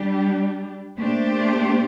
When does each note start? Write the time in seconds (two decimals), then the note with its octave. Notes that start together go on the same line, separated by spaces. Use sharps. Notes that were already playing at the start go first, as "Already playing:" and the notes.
Already playing: G3 D4 G4
0.98 A#2 A3 D4 G4 C5